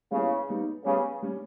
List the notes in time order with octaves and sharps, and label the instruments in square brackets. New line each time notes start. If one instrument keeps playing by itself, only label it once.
[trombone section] C#3 [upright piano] G3 B3 E4
[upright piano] G3 B3 D#4
[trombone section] C#3 [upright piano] G3 B3 G4
[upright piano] G3 C#4